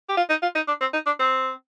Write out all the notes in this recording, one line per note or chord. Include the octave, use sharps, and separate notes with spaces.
G4
F4
D#4
F4
D#4
D4
C4
D#4
D4
C4